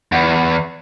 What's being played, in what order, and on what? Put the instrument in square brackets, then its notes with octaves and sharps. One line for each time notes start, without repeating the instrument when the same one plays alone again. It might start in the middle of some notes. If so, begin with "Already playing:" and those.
[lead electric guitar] E2